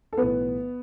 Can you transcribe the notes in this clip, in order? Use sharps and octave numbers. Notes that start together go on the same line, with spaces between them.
A4
B1 A2 E3 B3 B4